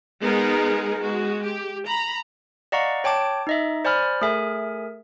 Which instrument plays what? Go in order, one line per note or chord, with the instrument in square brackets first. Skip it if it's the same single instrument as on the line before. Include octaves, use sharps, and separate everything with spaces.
[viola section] G#3 B3 D#4 G#4 A#4
G#3 F#4
G4
A#5 B5
[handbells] D5 D#5 F5 F#5 A#5 C#6
C#5 G5 A5 D6 D7
D#4 D#5 E5
C5 D5 G#5 B5 F6
A3 G#4 A#4 E5 G#5